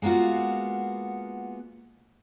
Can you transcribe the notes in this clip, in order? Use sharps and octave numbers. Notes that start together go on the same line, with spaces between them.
G#3 A#3 B3 F4 F#4